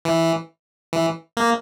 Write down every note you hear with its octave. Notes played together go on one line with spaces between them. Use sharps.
E3
E3
A#3